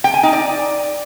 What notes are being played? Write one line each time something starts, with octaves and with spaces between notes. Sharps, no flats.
G5
G#5
D#4
D5